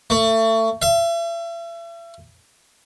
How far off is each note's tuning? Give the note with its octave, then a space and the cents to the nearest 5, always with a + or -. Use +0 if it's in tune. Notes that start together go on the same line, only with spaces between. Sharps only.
A3 +30
E5 +40